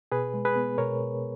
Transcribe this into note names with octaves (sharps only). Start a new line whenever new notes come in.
B2 G#4 B4
G#3
G#4 B4
B3
B2 A#4 C#5
B2